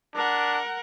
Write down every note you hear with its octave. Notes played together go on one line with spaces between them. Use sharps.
D4 A#4 F#5